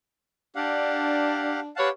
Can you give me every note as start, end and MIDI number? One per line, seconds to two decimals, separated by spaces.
0.55 1.66 62
0.55 1.60 67
0.55 1.60 77
0.55 1.60 78
1.76 1.89 67
1.76 1.89 71
1.76 1.89 73
1.76 1.89 77
1.76 1.89 78
1.76 1.89 81